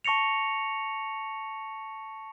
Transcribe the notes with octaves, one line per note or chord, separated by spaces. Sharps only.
A5 C#6 A#6 C#7 F7